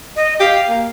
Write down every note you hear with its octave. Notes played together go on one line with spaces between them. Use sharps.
D#5
G4 F5
A#3